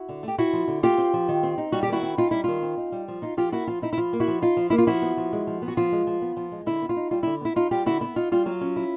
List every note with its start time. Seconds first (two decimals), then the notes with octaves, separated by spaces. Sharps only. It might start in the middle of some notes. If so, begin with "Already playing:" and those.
Already playing: E4 F#4
0.09 D3
0.23 A3 G4
0.38 C4 E4 F#4
0.53 F3
0.68 D3
0.83 A3 F4 G4
0.98 C4
1.13 F3
1.28 D#3
1.43 C4
1.58 D#4
1.72 G3 F#4
1.83 G4
1.88 D#3 E4 F#4
2.03 C4
2.18 D#4 F4
2.31 G3 E4
2.44 D#3 F4
2.62 C4
2.77 D#4
2.92 G3
3.08 F3
3.22 D#4 F4
3.37 F3 F4 G4
3.52 A#3 E4 F#4
3.67 F3 F4
3.82 D#4 E4
3.93 E4
3.98 F3 F4
4.13 A#3
4.20 E4 F#4
4.28 F3
4.42 D#4 F4
4.57 F3
4.70 A#3 E4
4.78 F4
4.87 F3 E4 F#4
5.02 B3
5.17 F3
5.33 G#3
5.47 F3
5.62 B3
5.68 F#4
5.77 F3 F4
5.92 G#3
6.07 F3
6.22 B3
6.37 F3
6.52 G#3
6.66 D3 E4
6.82 B3
6.89 F4
6.97 D#4
7.11 G3 F4
7.23 D3 E4
7.41 B3 E4
7.56 D#4 F4
7.71 G3 F4 G4
7.86 D3 E4 F#4
8.01 B3 E4
8.16 D#4 F4
8.32 G3 F4
8.46 F#3 F4
8.61 C#4
8.76 E4